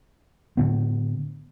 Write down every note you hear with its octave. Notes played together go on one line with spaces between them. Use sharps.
A2 D3 B3